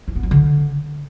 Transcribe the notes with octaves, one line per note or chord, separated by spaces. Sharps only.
E3
B3
F#3
D3